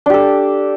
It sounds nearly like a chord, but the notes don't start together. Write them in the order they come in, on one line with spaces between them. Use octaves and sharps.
D4 G4 A4